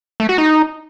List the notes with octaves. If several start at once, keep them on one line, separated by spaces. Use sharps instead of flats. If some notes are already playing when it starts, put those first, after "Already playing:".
A3
F#4
D#4